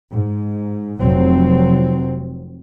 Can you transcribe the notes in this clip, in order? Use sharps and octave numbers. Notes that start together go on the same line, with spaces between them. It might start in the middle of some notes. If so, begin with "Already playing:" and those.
G#2
F1 F#3 C4